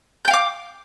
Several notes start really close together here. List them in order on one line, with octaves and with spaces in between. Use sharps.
G6 G5 F5 D6